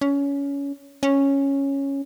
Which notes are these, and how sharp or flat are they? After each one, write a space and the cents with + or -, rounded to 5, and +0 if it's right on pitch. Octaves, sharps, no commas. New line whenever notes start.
C#4 +20
C#4 -5